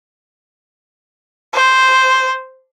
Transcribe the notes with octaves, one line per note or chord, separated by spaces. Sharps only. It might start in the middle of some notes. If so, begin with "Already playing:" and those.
C5